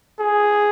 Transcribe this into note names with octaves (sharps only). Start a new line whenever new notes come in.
G#4